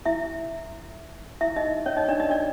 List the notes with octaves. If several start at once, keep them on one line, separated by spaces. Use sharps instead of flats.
E4 E5
E4 E5
D#4 D#5
C#4 C#5
D#4 D#5
D4 D5
D#4 D#5
D4 D5